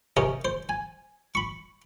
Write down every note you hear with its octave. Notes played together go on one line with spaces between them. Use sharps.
C3 C#4 A#4 D#5
C5
G#5
B5 C#6